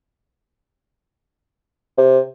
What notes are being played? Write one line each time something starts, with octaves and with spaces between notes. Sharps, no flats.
C3